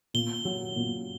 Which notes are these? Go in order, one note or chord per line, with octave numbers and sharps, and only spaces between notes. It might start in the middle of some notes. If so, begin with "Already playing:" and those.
A#2 G7
F#3
A#2